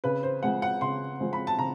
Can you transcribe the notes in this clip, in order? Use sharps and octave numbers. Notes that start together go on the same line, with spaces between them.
C#3 B4
C5
F3 G#3 C4 F#5
F#5
C#3 C6
F3 G#3 C4
B5
A5
C#3 A#5